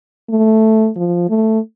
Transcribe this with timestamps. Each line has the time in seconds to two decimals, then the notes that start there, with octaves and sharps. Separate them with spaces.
0.30 A3
0.96 F3
1.29 A3